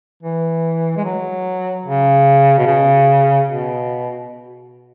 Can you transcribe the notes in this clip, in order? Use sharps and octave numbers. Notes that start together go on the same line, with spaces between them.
E3
G#3
F#3
C#3
B2
C#3
B2